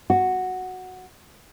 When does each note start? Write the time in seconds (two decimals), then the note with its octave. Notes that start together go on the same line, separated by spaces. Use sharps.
0.10 F#4